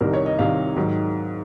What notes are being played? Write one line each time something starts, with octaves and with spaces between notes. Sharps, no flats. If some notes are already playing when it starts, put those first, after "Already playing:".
C2 C3 D#3 A#4
C#5
D#5
C2 C3 D#3 F5
G#2 D#3 F#3